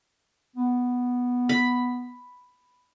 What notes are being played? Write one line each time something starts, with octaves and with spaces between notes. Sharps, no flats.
B3
B5